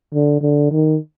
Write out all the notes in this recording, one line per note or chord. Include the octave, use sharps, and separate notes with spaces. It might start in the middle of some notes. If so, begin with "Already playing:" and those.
D3
D3
D#3